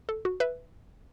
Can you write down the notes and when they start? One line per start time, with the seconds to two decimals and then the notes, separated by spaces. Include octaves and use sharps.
0.09 A4
0.25 F#4
0.40 B4 E5